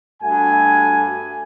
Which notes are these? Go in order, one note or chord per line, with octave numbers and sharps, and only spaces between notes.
G2 A3 F#4 G#5